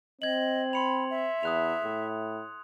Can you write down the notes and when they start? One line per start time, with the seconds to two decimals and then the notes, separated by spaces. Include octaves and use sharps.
0.22 C4 D#5 G#6 F#7
0.73 B5 C6 C#7 F7
1.10 E5
1.43 E2 D#6 F#6 F7
1.84 A2